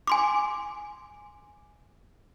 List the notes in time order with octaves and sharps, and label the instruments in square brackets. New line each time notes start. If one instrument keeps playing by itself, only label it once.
[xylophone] G#5 C6 D6